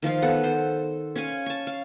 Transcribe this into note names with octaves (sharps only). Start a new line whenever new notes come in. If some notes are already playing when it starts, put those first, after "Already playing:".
D#3 F3 F4 F5
B3 A4 F#5
C5
C#4 C#5 F5 G#5
A5 C#6
F5